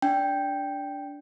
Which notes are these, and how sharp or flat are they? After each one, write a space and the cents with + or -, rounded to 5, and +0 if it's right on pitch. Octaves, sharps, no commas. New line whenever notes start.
D4 -15 G5 +0